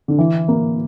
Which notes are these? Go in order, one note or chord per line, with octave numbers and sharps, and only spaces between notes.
D3
E3
A#3